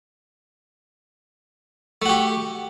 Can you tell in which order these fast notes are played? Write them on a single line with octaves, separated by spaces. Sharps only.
A3 F#4 G4